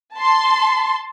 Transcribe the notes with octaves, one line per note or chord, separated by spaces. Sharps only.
A5 C6